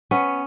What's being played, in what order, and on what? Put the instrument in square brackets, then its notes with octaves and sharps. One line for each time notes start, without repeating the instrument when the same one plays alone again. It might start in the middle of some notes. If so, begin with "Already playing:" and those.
[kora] B3 C#4